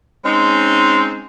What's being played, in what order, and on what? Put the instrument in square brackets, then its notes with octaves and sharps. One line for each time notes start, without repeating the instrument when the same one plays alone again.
[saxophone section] G#3 C4 C#4 D#4